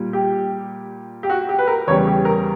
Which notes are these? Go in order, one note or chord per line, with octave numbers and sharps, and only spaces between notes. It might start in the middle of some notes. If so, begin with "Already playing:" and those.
Already playing: A#2 G3
G4
G4
F#4
G4
B4
A#4
E2 C#3 G3 C#5
G4
A#4